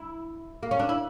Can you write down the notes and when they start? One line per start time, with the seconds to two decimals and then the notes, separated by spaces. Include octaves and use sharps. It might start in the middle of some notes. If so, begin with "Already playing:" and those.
Already playing: E4
0.63 A#3
0.71 C#4
0.79 D4
0.89 E4